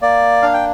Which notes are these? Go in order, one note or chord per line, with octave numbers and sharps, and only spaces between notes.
A#3 D5
D4 F5
G5